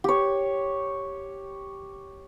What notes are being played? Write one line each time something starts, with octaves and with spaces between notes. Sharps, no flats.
G4 C#5